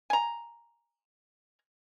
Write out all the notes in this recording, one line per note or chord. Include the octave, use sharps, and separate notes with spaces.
G#5 A#5